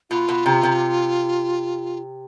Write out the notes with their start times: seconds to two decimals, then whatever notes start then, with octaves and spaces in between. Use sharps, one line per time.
0.10 B2 F4
0.29 B2
0.46 C3
0.63 C3